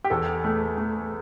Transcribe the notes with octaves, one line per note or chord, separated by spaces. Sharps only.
G4
E2 A4
A3
A3